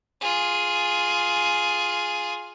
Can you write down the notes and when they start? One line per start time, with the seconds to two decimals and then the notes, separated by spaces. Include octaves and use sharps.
0.21 F4 G#4